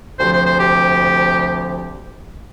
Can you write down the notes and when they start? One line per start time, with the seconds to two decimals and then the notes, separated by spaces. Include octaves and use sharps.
0.18 D2 C3 F3 C5
0.32 C5
0.46 C5
0.59 G4